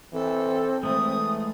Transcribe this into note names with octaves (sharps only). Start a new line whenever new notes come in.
E3 C4 A4
E3 G#3 A3 D#6